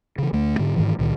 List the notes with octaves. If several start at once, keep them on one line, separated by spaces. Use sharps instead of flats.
C#3 E3
D2 A3
G#2 D3
G#2 D#3 E3
C#2 A#2 D#3